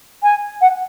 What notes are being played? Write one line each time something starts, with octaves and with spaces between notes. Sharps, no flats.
G#5
F#5